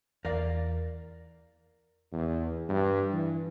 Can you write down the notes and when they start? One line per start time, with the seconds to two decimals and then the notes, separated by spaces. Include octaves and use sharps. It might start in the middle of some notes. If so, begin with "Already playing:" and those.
0.25 E2 A#4 D5 F5
2.12 E2
2.69 G2
3.13 E3